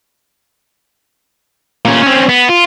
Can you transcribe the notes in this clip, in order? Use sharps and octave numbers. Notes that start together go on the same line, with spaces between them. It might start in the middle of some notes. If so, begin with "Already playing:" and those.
A#2 C#4
C4 C#4
B3
F4